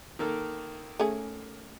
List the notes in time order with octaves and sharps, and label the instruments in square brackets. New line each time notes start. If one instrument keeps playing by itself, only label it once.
[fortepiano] D#3 A#3 A4
[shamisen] A3 C#4 G#4